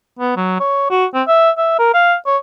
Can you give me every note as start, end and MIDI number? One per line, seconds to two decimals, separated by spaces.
0.19 0.35 59
0.37 0.59 54
0.60 0.88 73
0.90 1.05 66
1.14 1.22 60
1.28 1.50 76
1.58 1.75 76
1.79 1.91 70
1.94 2.15 77
2.26 2.37 73